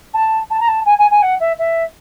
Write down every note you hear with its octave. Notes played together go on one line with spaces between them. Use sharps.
A5
A5
A#5
A5
G#5
G#5
G#5
F#5
E5
E5